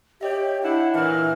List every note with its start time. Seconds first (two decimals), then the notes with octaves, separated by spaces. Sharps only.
0.21 G4 C#5 D#5 E5
0.63 D4 E4 F#5
0.95 A#2 E3 F6